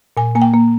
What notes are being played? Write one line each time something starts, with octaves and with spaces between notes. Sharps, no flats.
A#2 G#5
A#3 G#5
G5
A#3